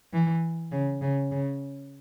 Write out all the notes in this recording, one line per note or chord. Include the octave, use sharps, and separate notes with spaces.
E3
C#3
C#3
C#3